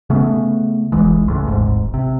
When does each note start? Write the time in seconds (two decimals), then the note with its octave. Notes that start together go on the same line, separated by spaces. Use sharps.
0.10 C#3 A3 B3
0.92 F1 C2 E3 G#3
1.28 C#2 A2
1.47 D#1 G#1 G#2
1.94 C3